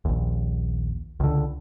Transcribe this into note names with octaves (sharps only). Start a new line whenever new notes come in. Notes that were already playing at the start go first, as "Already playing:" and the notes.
A#1 D#2
C#2 D3